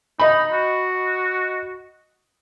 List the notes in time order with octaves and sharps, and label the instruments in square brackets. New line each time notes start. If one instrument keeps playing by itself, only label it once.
[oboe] D#4 [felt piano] D#5 B5
[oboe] F#4